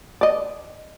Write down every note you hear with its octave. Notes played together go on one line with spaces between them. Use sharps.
D5 D#5